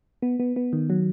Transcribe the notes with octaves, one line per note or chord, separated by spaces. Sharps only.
B3
B3
B3
D#3
F#3